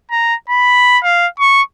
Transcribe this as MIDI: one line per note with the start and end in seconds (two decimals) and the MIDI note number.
0.11 0.34 82
0.50 0.98 83
1.04 1.27 77
1.39 1.62 85